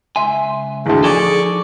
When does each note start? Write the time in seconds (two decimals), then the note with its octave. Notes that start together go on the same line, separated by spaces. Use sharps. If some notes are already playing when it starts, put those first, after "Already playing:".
0.16 C#2 E5 G#5 C6
0.86 A1 D2 G#4
1.04 F3 D#4 A4 D5 G#5 C#6